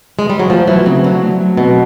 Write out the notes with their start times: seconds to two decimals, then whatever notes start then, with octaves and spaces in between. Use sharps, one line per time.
0.19 G#3
0.30 G3
0.40 F#3
0.50 F3 A3
0.67 E3 F#3
0.86 C#3 C4
1.04 D3 F#3
1.22 A3
1.40 F#3
1.57 B2 C4